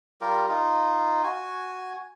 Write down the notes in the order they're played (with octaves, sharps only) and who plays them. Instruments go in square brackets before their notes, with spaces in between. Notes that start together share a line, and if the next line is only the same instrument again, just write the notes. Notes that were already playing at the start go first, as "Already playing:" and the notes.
[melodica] G3 F4 G4 A#4
D#4 F4
F#4 G#5